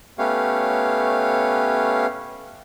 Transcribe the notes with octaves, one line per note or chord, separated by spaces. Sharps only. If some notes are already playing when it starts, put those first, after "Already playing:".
A3 B3 C#4 G4 C#5 F5